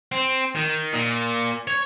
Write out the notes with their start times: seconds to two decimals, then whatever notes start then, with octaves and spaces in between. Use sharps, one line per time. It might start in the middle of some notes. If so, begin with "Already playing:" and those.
0.12 C4
0.56 D#3
0.93 A#2
1.67 C#5